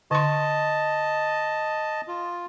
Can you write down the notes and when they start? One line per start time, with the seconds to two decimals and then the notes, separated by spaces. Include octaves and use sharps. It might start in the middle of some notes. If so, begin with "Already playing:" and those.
0.11 D3 D#5 A5 C6
2.08 F4